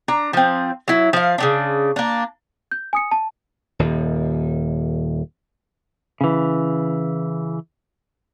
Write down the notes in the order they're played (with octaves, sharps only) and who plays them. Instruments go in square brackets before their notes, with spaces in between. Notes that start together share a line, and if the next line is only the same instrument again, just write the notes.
[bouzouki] D4 A#5
F3 C4
F#3 E4
F3 F5
C#3 F#3 D4
A#3 D4
[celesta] G6
G#5 D#6 C#7
A5
[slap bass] D#1 D#2
[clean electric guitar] C#3 E3